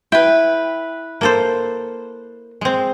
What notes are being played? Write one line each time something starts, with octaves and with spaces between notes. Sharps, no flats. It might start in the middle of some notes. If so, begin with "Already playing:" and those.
E4 B4 G5
A#3 A4 C5
G#3 C4